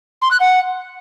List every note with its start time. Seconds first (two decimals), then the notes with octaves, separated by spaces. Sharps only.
0.22 C6
0.31 F#6
0.40 F#5